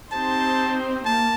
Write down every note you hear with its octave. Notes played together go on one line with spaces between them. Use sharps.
C4 D#4 G4 C5 A5
A#3 A5